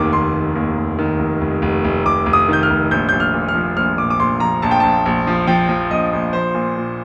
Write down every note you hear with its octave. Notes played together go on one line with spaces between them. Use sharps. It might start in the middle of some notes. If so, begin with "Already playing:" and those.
Already playing: F1 D#2 D#3 D6
D#2 C6
D#3
D#2
F1
D#3
F1
F1
F1
F1
F1 D6
F1
D#6
D#3 G6
F6
F1
A#1 G6
G6
A#1
F6
A#2
F6
F3
A#1 F6
A#2 D6
D6
A#1 C6
F3 A#5
A#1 A5
G5
A#1 A5
A#1
F3
F3 G5
F3
A#1 D#5
A#1
F3 C5
A#2
A#2